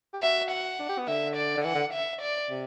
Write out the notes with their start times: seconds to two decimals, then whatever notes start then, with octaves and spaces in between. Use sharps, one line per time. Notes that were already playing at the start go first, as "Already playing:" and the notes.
0.13 G4
0.22 F#4 E5
0.51 F#5
0.79 D4
0.89 G4
0.98 B3
1.08 D3 E5
1.36 D5
1.57 D3
1.64 E3 F#5
1.75 D3
1.94 E5
2.22 D5
2.50 C3